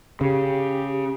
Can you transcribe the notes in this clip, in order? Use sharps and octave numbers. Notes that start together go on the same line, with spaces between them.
C#3 G4